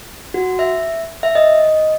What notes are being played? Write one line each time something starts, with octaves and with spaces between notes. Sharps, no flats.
F#4
E5
E5
D#5